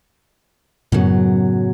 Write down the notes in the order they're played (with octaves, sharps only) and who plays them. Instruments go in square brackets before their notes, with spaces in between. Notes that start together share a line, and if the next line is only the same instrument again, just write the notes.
[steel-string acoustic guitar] F#2 F#3 [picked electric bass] A2 C#3 B3